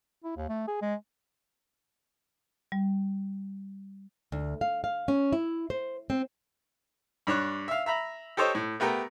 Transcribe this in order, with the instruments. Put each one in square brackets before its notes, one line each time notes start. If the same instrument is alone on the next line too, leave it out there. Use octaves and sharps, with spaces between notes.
[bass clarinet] E4
D#2
A3
G#4
G#3
[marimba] G3
[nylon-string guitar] D2
F5
F5
C#4
E4
C5
C4
[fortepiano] G2 D4 C#5 F#6
E5 F5
E5 A#5 B5
G4 A4 C5 C#5 D#5
A2
A3 B3 G4 A#4